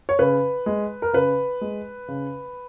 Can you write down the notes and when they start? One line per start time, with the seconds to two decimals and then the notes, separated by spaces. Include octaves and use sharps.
0.09 C#5
0.19 C#3 B4
0.66 G#3
1.02 A#4
1.13 C#3 B4
1.61 G#3
2.08 C#3